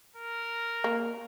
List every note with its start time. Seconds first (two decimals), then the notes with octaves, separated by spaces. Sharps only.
0.16 A#4
0.84 A#3